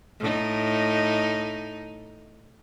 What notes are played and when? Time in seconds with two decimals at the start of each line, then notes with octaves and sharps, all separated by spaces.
0.20 A2 D#4